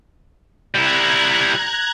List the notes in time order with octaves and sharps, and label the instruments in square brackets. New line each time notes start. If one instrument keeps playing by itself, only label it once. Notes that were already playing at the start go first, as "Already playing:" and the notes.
[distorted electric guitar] G3 E4 [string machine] A#5 F#6 G#6